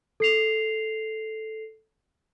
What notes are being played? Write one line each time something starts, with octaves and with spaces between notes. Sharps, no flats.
A4 C7 F7